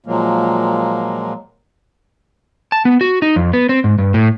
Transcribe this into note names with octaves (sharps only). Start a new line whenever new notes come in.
A#2 F3 F#3 G#3 A#3
A5
B3
F#4
D#4
F2
B3
C4
G#2
G2
A2